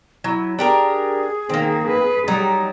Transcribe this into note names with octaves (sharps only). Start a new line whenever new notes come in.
F#3 E4
D4 G4 G#4 A#4
D#3 A#3 C4
B4
F#3 G3 D#4